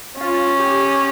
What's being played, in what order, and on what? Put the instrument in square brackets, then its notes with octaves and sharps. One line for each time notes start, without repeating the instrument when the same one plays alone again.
[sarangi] C#4 [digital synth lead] F4
[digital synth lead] G4